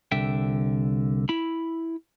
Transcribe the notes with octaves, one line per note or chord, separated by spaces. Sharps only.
C2 D3 E5 G5
E4 B5